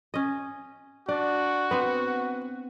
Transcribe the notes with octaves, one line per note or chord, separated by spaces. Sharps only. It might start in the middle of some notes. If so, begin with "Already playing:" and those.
C#4 D#5
D4 F#4 D5
B3 C4 B4